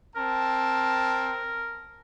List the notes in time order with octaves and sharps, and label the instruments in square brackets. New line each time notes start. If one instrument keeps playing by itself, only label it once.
[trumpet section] C4 A5 [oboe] A#4